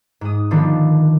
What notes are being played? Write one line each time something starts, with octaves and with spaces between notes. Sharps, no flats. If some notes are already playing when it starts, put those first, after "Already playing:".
G#2 D#6
D3 D#3 F3 B3 D4